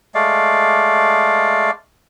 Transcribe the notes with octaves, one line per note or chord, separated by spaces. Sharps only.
G#3 A3 D5 F5